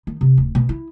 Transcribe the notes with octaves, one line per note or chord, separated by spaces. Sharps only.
D#3
C3
D1
B2
E4